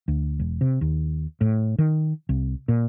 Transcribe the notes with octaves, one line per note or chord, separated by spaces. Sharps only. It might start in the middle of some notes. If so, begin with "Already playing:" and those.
D2
E1
C3
D#2
A2
D#3
C2
A#2